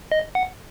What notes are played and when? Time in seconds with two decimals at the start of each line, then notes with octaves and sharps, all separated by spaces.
0.12 D#5
0.35 F#5